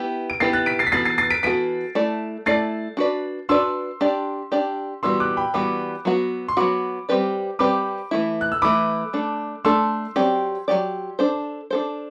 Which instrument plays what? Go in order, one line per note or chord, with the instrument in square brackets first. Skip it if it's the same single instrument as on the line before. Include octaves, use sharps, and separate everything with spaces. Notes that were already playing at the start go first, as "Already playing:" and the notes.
Already playing: [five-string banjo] B3 E4 G4 B4
[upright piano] D7
[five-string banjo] B3 E4 G4 B4 [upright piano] A6 C7
[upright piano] F#6 A6
B6 D7
A6 C7
B6
[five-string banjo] E3 B3 F#4 A4 [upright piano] A6 C7
[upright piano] A6 C7
A6 C7
B6 D7
[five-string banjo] E3 B3 F#4 A4 [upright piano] B6 D7
[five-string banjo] A3 E4 A4 D5
[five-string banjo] A3 E4 A4 D5 [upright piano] A6 C7
[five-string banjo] D4 F#4 B4 D5
[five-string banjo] D4 F#4 B4 D5 [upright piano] C6 E6
[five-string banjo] D4 G4 D5
D4 G4 D5
[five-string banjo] E3 G3 B3 F#4 [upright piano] C6 E6
[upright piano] D6 F#6
G5 B5
[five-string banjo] E3 G3 B3 F#4 [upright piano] B5 D6
[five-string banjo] F#3 B3 F#4
[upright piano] C6
[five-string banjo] F#3 B3 F#4 [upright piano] B5 D6
[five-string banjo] G3 C4 G4 B4 D5
[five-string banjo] G3 C4 G4 B4 D5 [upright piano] B5 D6
[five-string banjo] E3 A3 E4
[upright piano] F#6
E6
[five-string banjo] E3 A3 E4 [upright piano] B5 D6
[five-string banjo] A3 D4 A4
[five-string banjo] A3 D4 A4 [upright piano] C6 E6
[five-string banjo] F#3 C4 G4 D5
F#3 C4 G4 D5
D4 A4 C5
D4 A4 C5